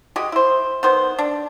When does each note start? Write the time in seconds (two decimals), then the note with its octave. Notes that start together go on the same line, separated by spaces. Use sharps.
0.16 G#3 F#4 G4 D#5
0.32 E4 C5
0.83 D#3 B3 C5
1.19 D4